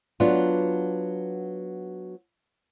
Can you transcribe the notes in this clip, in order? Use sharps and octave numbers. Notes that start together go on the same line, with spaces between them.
F#3 B3 D4 F4